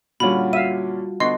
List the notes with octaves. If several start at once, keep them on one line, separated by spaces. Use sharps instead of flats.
A#2 D3 G3 C#4 F4 F#4 B5
E5 F5 D#7
D3 B3 D#5 C6 C#6